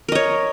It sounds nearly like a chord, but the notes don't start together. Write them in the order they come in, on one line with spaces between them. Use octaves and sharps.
A#4 D#5 C#5